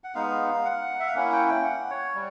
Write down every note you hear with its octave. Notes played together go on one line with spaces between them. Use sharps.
F#5
G#3 B3 D#4 F5
F#5
E5
F5
A#3 C#4 E4 F#5
G5
G5
F#5
C#5
G3